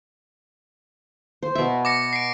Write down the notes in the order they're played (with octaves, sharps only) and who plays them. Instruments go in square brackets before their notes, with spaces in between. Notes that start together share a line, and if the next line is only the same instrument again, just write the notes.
[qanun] C5
B2 E5
[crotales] D6 A#6 C#7
C7 D7